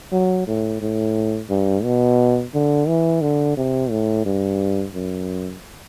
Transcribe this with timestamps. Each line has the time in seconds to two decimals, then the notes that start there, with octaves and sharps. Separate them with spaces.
0.12 F#3
0.47 A2
0.81 A2
1.50 G2
1.84 B2
2.54 D3
2.88 E3
3.21 D3
3.57 C3
3.90 A2
4.25 G2
4.94 F#2